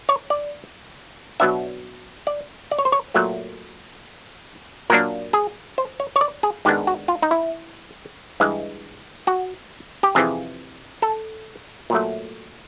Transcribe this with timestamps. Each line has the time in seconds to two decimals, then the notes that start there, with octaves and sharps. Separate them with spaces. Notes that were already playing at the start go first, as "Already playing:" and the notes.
0.09 C#5
0.30 D5
1.40 B2 F#3 B3 D4 E5
2.27 D5
2.71 D5
2.79 C#5
2.85 C5
2.92 C#5
3.14 A#2 F#3 A3
4.90 A#2 F#3 A#3 D4 A#4
5.33 G#4
5.78 C5
6.00 C#5
6.16 C#5
6.21 D5
6.43 G#4
6.65 G#2 D#3 G#3 B3 D4 G4
6.87 F#4
7.08 F4
7.22 D#4
7.31 E4
8.40 G2 E3 G#3
9.27 F#4
10.03 G4
10.15 F2 C3 E3 G#4
11.02 A4
11.90 A#2 F#3 A3